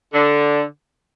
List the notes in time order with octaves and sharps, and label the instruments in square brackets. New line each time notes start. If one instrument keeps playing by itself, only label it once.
[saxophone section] D3